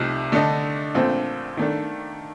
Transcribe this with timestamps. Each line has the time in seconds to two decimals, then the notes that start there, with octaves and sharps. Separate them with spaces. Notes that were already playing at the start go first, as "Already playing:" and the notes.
Already playing: C2 C3 F3 A3 D#4
0.32 D3 A3 D4 A4 D#5
0.95 A#1 A#2 A3 C4
1.57 D#3 A3 D4